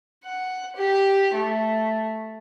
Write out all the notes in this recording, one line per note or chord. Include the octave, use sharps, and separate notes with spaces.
F#5
G4
A3